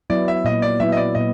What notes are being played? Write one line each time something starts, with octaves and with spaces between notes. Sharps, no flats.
F#3 B3 E4 D5
E5
A#2 D#5
D5
F#3 B3 E4 E5
D#5
D5
A#2 D#5